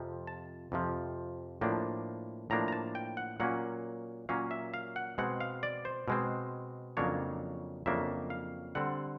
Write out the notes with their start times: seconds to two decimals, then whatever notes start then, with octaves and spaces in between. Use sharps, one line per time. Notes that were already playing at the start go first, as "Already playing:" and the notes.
Already playing: F2 C3 F3
0.27 A5
0.72 F2 C3 F3
1.61 A2 F3 A#3 D4
2.50 A2 F3 A#3 D4 A#5
2.68 A#5
2.72 A5
2.95 G5
3.17 F#5
3.40 A#2 F#3 A#3 C#4 F#5
4.29 A#2 F#3 A#3 C#4 F5
4.51 E5
4.74 F5
4.96 F#5
5.18 B2 G#3 C4 F#5
5.40 F5
5.63 D5
5.85 C5
6.08 B2 G#3 C4
6.97 F2 C#3 F#3 A#3 D4 C#5
7.86 F2 C#3 F#3 A#3 D4 E5
8.30 F5
8.75 D3 G3 C4 F#5